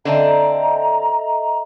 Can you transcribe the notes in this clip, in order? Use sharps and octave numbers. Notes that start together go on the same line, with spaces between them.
D3 C4 D4 A4 D#5 E5 A#5